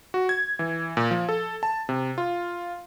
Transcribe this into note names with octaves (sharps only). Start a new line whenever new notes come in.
F#4
G#6
E3
A#2
F3
A4
A5
C3
F4